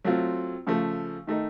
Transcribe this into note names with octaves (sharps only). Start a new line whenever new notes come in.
F#3 A3 C4 F4
C#3 F3 A3
D#3 A3 D#4